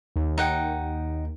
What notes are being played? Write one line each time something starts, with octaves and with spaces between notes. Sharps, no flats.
D#2
D#4 F#5 G5